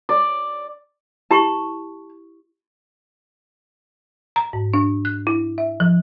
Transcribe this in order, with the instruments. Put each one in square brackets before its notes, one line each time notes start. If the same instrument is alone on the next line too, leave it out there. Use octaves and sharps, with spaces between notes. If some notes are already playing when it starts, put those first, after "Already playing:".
[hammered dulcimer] D5
[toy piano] E4 G4 C#6 [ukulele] A5
[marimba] A#5
G#2
D4
F#6
E4
E5
F3